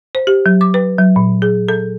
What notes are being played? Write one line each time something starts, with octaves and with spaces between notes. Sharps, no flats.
C5
G4
F#3
D6
B4
F#3
A#2
G#4
A4